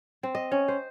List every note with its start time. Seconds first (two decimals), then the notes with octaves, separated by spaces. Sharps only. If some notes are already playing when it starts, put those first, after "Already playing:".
0.23 C4
0.35 D#5
0.52 C#4
0.68 C5